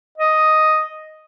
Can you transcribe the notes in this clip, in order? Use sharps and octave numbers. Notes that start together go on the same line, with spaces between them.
D#5